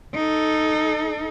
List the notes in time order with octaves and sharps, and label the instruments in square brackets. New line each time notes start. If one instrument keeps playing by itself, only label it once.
[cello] D#4 A4